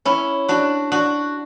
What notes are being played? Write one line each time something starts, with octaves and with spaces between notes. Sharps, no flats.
C#4 E4
D4 F#4
D4 F#4